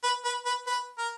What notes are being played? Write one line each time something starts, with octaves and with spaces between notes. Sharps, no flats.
B4
B4
B4
B4
A#4